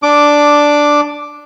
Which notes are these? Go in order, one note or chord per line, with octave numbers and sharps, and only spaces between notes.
D4 D6